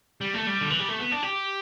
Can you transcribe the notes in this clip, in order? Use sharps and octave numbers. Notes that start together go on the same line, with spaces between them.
G3
A3
G3
D3
E3
G3
A3
B3
D4
G4